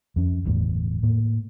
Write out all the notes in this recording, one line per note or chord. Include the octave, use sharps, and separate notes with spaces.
F2 C#4
G1 E2 A2
A2 A#3